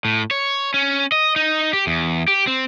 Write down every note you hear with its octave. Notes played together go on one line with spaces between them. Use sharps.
A2
C#5
C#4
D#5
D#4
G4
E2
G4
C4